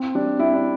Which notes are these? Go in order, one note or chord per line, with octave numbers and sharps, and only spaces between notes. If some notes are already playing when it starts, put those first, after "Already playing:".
Already playing: C4
G3 D4
C4 E4
D4